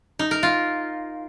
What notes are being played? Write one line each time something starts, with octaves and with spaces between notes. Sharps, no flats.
D#4
A#4
F4